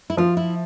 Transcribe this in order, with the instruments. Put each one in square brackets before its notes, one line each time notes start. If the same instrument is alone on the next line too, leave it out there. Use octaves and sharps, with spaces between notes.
[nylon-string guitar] E4
[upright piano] F3 [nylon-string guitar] F4
[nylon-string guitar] E4